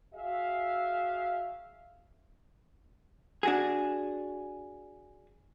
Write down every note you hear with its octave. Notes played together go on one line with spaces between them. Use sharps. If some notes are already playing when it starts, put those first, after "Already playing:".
F#4 G#4 E5 F5
D4 F#4 G#4